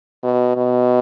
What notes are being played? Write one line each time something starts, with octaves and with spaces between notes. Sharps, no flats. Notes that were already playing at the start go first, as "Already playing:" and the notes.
B2
B2